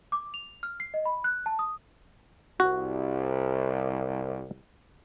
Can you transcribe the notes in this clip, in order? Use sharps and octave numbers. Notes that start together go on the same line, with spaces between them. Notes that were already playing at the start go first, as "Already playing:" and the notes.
D6
F7
F6
C7
D#5
B5
F#6
A5
D#6
C2 F#4